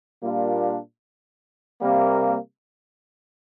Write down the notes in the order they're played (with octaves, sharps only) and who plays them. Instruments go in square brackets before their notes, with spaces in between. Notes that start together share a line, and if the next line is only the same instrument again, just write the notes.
[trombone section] A#2 G3 A#3 D4 F4
C3 G3 A#3